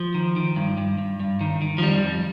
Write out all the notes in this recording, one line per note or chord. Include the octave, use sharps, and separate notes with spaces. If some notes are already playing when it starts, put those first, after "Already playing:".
Already playing: F3
D#3
D#3
G2
G2
G2
G2
D#3
D#3
F3
F2 G3
F2